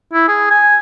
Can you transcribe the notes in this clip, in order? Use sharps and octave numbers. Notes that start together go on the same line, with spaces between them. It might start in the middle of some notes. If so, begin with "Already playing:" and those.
E4
G#4
G#5